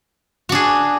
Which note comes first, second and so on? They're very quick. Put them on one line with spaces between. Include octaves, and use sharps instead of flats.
F#4 D4 G#4